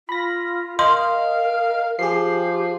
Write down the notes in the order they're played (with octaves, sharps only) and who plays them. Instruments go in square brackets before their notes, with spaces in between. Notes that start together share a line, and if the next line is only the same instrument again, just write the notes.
[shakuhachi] F4 [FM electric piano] B5 A#6
[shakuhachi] A#4 [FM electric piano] D#5 [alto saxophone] F5 [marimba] C6
[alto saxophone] F3 [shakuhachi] G4 [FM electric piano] G#4 C7